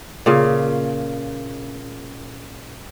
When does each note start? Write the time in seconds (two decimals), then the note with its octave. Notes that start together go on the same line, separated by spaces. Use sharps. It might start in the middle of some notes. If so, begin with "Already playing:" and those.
0.26 A#2 C#3